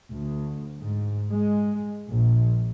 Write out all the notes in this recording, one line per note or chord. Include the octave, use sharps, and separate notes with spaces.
D2
G#2
G#3
A#1